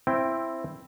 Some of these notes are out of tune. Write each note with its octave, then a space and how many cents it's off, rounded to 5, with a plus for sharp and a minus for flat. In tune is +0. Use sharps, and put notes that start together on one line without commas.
C4 +10 E4 +10 G5 +0